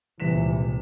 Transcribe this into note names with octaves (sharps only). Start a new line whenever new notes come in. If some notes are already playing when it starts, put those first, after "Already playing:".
D#1 C#2 C3 E3 B6 E7